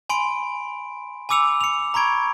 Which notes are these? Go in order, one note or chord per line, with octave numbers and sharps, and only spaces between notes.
G#5 B5 C6 D7
G#5 B5 D6 E6 C#7 F7
C#7 F7
A#5 B5 C#6 G#6 D7